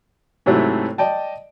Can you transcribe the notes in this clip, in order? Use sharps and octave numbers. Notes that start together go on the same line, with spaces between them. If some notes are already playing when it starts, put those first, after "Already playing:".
G#2 C3 F#3 A3 E4
D5 D#5 G5 A5